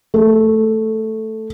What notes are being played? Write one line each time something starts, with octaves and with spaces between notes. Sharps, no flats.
A3